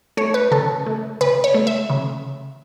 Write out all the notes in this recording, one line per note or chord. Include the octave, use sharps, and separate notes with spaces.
A3 C#5
B4
C#3 A4
A3
C#3 B4
C#5
A3
E5
C#3